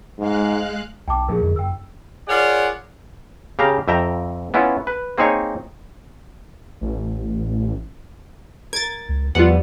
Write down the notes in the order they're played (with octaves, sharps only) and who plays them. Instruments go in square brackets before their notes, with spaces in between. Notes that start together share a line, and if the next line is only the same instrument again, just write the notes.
[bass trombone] G#2 [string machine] G#3 F5 F#6
[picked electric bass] B1 [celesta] G5 A5 D6
[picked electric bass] A#2 F3 D4 [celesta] G#4 A#4
[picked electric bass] F2 D3
[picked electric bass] F#1 [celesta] G5 E6
[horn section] F4 G#4 A#4 C#5 D5 F#5
[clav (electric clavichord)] C#3 G4 F5 A#5
F2 E5 G5 A#5
B3 C#4 E4 F4
B4
A#3 C4 D#4 G#4 C#5
[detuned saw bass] A1
[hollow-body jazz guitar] A#4 [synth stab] G#6 A6
[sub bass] C#2
[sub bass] E2 [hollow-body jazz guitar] F3 G3 B3 [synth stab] F4 F#5